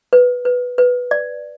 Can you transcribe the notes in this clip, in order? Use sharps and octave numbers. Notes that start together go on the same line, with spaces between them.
B4
B4
B4
D5